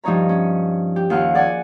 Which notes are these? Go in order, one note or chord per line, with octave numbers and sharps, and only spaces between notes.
G2 F3 D#4 C#5 A#5
C#4
G4
D#2 F4 F5 F#5
G#4 D5 F#5 G#5